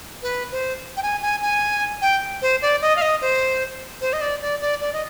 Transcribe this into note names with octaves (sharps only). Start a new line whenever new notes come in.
B4
C5
G5
G#5
G#5
G#5
G5
C5
D5
D#5
F5
D#5
C5
C5
D#5
D5
D5
D5
D5
D#5